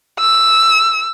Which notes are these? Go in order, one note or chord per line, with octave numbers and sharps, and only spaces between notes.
E6